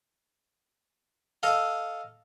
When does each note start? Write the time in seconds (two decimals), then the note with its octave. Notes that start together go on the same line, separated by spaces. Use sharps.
1.43 A4 D#5 F5